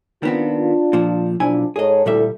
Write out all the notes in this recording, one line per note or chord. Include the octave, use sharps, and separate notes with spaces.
D#3 B3 C4 D4 F4
A#2 F3
B1 F3 D4 E4 G#5
G#2 G#4 A4 C#5 D#5
D2 A#2 G3 E4 A4 E5